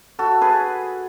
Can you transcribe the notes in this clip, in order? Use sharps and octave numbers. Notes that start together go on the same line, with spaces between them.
F#4 A4
G#4 B4